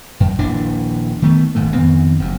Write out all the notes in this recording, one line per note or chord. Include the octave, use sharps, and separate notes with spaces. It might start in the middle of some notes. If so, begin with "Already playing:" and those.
F#2
D#1 A#1 E3 D4
D#3 A3 B3
D#1 G#1 G#2 A3
F2 D#3 B3 C4
F#1 F#2